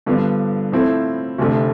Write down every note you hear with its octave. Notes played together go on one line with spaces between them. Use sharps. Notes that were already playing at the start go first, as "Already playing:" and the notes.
G2 D3 F3 B3 D4
A2 F3 C4 E4 A4
F1 F2 D3 A3